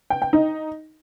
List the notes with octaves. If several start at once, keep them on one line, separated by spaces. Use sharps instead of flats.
G5
G5
D#4